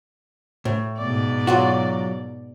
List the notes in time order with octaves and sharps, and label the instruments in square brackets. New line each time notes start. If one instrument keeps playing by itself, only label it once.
[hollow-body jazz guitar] A2
[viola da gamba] G#2 B2 D5
[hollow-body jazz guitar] F#3 F4 F#4